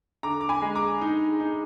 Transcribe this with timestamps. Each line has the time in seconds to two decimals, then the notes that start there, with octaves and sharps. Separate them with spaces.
0.23 D3 A#5 D6
0.41 D6
0.49 G#5 B5
0.62 G#3
0.75 A#5 D6
1.01 D#4
1.40 D#4